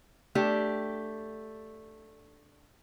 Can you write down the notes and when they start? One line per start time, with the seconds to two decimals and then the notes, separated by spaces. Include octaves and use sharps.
0.35 A3 D4 G4